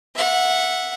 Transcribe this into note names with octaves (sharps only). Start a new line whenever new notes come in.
E5 F#5